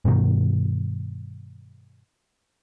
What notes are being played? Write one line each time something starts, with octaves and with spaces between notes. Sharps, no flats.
G2 B2 D#3